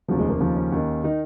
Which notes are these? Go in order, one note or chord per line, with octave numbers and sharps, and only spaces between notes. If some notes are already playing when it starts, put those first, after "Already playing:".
F1 D#2 C#3 F3 F#3
G#3
A#3
D#2 C#3 F3
C#4
D#2 D#3
D#3 D#4